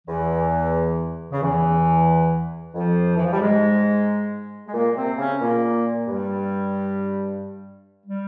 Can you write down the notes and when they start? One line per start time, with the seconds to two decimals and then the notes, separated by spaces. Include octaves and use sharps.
0.07 E2 E3
1.31 C#3
1.41 E2 E3
2.74 F2 F3
3.17 E3
3.24 F3
3.33 G3
3.41 G#2 G#3
4.67 G#3
4.73 A#2 A#3
4.96 C3 C4
5.18 C#3 C#4
5.41 A#2 A#3
6.07 G2 G3
8.06 G3